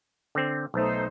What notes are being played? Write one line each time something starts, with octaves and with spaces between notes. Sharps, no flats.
D3 C4
B1 A3 D#4 C5